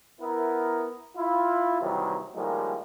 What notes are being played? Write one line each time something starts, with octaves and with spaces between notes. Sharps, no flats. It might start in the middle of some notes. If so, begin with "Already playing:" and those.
B3 E4 A#4
E4 F4
D#2 C3 D#3 E3 F#3 G3
A2 D#3 F3 G3 G#3 A#3